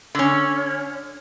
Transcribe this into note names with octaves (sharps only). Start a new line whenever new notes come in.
D3 C#4